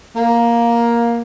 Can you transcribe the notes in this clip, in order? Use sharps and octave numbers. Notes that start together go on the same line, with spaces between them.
A#3